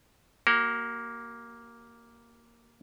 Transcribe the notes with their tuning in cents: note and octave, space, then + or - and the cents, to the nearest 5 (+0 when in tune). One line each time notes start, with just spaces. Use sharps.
A#3 +0 F#4 +45